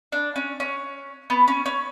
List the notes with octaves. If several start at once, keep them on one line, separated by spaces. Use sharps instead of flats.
D4
C#4
C#4
B3
C#4
C#4